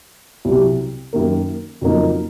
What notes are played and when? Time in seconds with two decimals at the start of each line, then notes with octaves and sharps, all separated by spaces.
0.45 C2 C3 F#3
1.13 F#2 D#3 A#3
1.81 F2 C#3 F#3 A#3 D#4